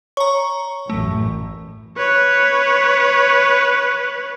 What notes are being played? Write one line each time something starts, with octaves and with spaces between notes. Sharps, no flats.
C#5 A#5 C#6
A1 F#2 A3
B4 C#5